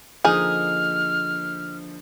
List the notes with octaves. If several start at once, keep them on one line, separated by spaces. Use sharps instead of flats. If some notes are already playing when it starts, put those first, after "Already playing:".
D3 F3 A#3 D#4 G#4 F6